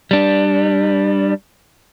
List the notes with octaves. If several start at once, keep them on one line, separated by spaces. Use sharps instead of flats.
G3 D4